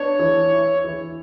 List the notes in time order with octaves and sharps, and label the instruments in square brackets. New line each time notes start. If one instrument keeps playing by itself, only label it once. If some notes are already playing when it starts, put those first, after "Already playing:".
Already playing: [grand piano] B3 D4 [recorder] C#5
[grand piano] E3
E4
E3